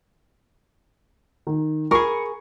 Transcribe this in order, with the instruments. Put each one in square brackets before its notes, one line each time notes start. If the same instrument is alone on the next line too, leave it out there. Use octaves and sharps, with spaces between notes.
[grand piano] D#3
[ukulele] G#4 A#4 [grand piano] B5 C#6